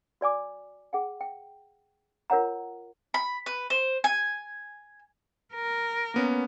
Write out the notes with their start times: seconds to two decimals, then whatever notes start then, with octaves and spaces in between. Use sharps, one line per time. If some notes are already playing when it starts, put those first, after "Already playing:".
0.21 F#4 D5 G#5 D6
0.93 G#4 F#5 G5
1.21 G5
2.30 F4 A#4 C#5 F#5 A#5
3.14 B5
3.46 B4
3.70 C5
4.04 G#5
5.54 A#4
6.14 A#3 B3 C#4